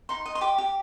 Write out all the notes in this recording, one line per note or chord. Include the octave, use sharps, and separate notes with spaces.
D#4 C6
D#5
C6
G4 D6
G4